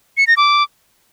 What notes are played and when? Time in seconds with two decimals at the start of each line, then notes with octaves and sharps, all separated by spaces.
0.17 C#7
0.27 A#6
0.37 D6